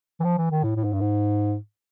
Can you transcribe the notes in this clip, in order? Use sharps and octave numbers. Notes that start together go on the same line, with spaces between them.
E3
F3
E3
D#3
A2
A2
G#2
G2
G#2